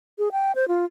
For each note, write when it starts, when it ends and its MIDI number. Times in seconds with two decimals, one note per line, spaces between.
0.19 0.29 68
0.32 0.52 79
0.55 0.68 72
0.68 0.85 65